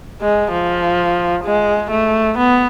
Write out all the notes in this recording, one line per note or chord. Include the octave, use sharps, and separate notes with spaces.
G#3
F3
G#3
A3
B3